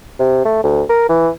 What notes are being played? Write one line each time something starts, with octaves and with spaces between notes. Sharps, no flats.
C3
A3
D2
A#4
E3